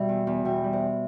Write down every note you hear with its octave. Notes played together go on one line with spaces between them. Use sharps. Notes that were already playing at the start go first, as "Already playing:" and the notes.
Already playing: B2 G3 E5 G5
E2
E2
B2 E5 G5
G3
C5 E5